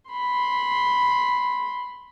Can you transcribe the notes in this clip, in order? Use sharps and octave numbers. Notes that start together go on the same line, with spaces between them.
B5 C6